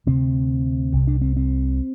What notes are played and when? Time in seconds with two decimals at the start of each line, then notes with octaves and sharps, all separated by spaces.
0.07 D2 C3 C4
0.93 C2 C3
1.07 D4
1.21 C4
1.37 C4